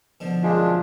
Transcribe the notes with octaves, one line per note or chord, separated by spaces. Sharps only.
B2 D3 F3
F#2 G#3 D4 F4 F5